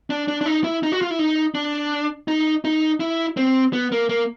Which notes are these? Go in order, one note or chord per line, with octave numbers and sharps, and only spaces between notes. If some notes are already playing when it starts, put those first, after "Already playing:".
D4
D4
D4
D#4
E4
D#4
F#4
F4
E4
D#4
D4
D#4
D#4
E4
C4
B3
A#3
A#3